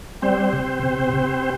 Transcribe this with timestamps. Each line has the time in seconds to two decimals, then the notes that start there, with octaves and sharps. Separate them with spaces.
0.22 G3 C4 C5
0.53 C3
0.83 C3
1.13 C3